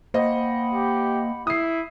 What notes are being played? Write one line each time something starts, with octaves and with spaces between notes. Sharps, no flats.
A#3 C5 D#5 F#5 G5 B5
G4
E4 D#6 C7